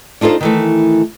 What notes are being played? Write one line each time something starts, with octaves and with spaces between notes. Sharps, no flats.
D4 D#4 F4 A4 C5
D#3 E3 A3